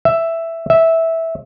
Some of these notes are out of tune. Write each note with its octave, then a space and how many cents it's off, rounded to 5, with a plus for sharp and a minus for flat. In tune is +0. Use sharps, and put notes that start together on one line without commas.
E5 +5
E5 -10